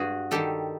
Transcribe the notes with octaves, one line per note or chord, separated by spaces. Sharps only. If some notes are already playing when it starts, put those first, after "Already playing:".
Already playing: G2 F#4 G#4
D#3 G3 G4 A4